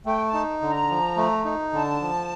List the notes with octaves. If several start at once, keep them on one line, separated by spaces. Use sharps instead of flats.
A3 G5
A5
D#4
D3
A#5
F3
A3
D#4
D3 A5
F3